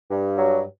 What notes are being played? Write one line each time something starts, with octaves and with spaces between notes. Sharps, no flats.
G2
F#3